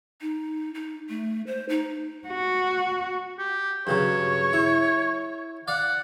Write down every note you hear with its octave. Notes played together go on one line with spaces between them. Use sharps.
D#4
D#4
A3
C5
D#4
F#4
G4
G2 C#3 F#3 C#5
E4
D5 F5 F#5